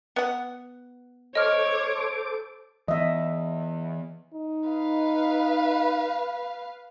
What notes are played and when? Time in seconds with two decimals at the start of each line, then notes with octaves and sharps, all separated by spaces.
0.16 B3 F#5
1.35 A4 C5 C#5 D#5 D6 F6
2.88 E3 B3 D#5 E5
4.34 D#4
4.69 B4 F5